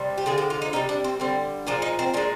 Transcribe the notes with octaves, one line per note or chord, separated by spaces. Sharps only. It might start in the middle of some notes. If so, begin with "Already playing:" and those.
Already playing: C3 G3
G4
D3 F3 G#3 G#4
G4
F4
D#4
C3 D#3 G3 D#4
D4
C4
D3 G3 C4
A#2 F3 G#3 D4
D#4
C4
A#2 G#3 D4